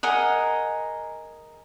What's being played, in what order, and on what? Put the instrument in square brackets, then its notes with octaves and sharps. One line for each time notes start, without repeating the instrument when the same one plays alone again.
[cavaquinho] G#4 A#4 D#5 F#5